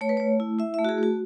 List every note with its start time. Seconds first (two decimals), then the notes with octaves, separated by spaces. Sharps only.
0.01 A3 C#5
0.09 B4
0.17 A3 C#5
0.40 E4
0.59 E4 E5
0.74 A3 E5
0.85 F#4
0.89 G#4
0.98 A3 F#4